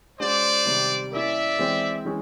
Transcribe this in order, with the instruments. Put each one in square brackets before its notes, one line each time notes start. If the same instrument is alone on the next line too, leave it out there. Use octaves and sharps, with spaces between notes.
[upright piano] G#3 C#4 F#4 [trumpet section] C5 D5
[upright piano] C3 D#3 G3 C4
[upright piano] A#3 C#4 E4 [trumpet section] D5 E5
[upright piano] E3 G#3 C4
E3 G#3 C#4